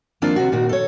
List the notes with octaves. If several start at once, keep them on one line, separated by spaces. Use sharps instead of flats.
D#3 F3 A#3 C4 D4 F4
C3 F#4
A#2 D#3 F#4
A4 C#5